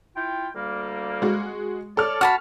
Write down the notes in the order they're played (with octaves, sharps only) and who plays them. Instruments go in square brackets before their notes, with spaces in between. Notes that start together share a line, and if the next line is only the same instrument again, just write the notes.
[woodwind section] E4 F4 G5
D2 G3 A#3
[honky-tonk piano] G#3 F#4
[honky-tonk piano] A4 F6 [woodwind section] C#5 D5
[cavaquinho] F#4 A5 B5 [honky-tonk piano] F6